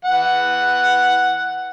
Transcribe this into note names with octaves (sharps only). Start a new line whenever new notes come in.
E3 F#5